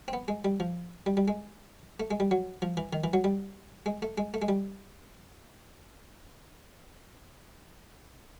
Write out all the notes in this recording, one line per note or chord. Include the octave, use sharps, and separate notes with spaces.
C4
B3
G#3
G3
F3
G3
G3
G#3
A3
G#3
G3
F#3
F3
E3
D#3
E3
F#3
G3
G#3
A3
G#3
A3
G#3
G3